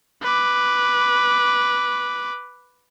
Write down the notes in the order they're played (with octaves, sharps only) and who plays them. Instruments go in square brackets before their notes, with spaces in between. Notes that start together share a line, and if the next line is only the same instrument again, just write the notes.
[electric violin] B4 D6